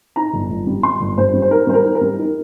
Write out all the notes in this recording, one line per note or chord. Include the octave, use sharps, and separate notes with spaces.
D#4 A#5
G1
G1
G3
G3 C6
G1
G2 C5
G3
C5
D#4 A#4
G3 C5
A#4
D#4
A#4
G3
D#4